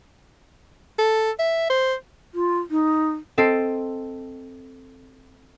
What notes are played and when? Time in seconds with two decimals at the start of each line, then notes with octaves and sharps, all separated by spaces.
0.99 A4
1.39 E5
1.70 C5
2.34 F4
2.71 D#4
3.38 C4 A4 D#5 C7 D7